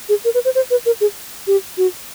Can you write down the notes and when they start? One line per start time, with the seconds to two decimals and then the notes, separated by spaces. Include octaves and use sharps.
0.09 G#4
0.25 A#4
0.34 B4
0.45 C5
0.55 C5
0.71 B4
0.86 A#4
1.01 G#4
1.47 G4
1.78 F#4